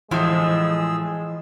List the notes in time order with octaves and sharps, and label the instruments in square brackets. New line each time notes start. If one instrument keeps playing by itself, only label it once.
[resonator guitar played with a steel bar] A2 F3 [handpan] E3 [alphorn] G#3 [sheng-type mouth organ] G#4 E6